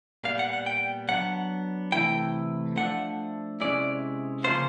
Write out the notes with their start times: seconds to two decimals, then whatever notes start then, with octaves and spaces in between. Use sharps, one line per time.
0.24 A#2 G3 B3 F5
0.39 F#5
0.53 F#5
0.66 G5
1.09 F#3 B3 D4 F#5
1.92 C3 E3 A3 E4 G5
2.76 F3 A3 D4 F#5
3.60 C3 F3 G#3 C#4 E4 D5
4.44 C#3 F3 A#3 C#4 F4 C5